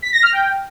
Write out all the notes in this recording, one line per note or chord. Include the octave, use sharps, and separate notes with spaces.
B6
A#6
F6
G5